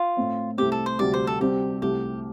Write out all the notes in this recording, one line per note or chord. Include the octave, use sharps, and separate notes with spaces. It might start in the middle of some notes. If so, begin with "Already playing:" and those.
Already playing: F4
A2 A3 C4
C2 C3 A3 C4 G4
A4
C5
D2 C3 G3 D5
C5
A4
C3 G3 C4 G4
C2 C3 A3 G4